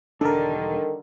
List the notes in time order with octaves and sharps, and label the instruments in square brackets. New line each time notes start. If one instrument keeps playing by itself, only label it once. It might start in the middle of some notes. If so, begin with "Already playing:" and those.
[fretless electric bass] E1 D4 [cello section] D3 G3 [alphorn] D#3 [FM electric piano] A4 A#4